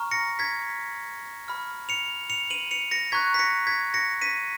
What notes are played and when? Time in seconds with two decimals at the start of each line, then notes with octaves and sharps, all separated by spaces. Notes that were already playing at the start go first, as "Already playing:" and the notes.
Already playing: A#5 C#6 F6
0.11 A#6 C#7
0.39 G#6 B6
1.48 B5 F6
1.89 C#7 F7
2.30 C#7 F7
2.50 D#7 F#7
2.71 C#7 F7
2.91 A#6 C#7
3.12 A#5 C#6 F#6 G#6 B6
3.34 B6
3.39 A#6 C#7
3.67 G#6 B6
3.94 A#6 C#7
4.22 B6 D#7